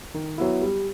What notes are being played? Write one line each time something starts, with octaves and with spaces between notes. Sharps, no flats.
D#3
F#3 B3 E4
G3